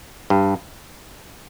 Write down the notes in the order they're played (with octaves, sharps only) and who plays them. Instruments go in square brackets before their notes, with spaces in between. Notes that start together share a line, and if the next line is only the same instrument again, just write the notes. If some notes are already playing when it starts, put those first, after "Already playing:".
[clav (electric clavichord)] G2